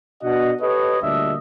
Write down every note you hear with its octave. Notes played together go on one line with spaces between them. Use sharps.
B2 D4 F#4 D#5 F#5
G4 A4 B4 C#5 D#5
D2 A#2 G3 D4 D#5 E5